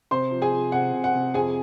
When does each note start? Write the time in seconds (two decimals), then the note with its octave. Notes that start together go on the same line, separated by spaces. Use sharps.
0.11 C3 C5 C6
0.31 F3
0.42 G#4 G#5
0.53 F3
0.72 C3 F#5
0.93 C3
1.04 F#5
1.15 C3
1.34 F2 G#4 G#5